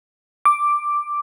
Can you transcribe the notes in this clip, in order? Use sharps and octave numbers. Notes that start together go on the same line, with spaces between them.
D6